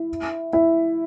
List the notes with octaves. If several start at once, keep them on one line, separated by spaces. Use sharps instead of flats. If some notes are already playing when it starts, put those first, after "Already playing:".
Already playing: E4
E4